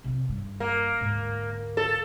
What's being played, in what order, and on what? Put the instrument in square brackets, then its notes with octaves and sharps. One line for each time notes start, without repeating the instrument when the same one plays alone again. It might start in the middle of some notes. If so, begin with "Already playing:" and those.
[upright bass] C3 F4
G2
[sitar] A#3
[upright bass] D2 G#2
[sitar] A4